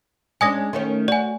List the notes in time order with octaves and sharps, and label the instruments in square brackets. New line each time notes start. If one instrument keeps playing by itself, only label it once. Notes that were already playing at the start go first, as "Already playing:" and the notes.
[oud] G#3 C#4 D4 [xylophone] G#5 D#6 A#6
[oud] D#3 A3 C#4
[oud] F#4 [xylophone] D5 G#5